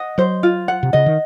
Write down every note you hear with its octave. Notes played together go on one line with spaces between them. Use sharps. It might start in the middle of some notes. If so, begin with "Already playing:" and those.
Already playing: D#5 F#5
F#3 C5
F4
F#5
C3
C#3 D#5
D#3